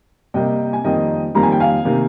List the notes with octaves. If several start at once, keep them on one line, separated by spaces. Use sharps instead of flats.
C3 G3 A#3 D#5 G5
G#5
F2 D#3 G3 A#3 D#5 G5
F2 D#3 G3 A#3 A#5
G#5
G5
F5 G#5
C3 D#3 A#3